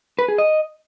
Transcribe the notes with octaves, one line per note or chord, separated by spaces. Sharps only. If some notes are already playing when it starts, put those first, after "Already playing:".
B4
G#4
D#5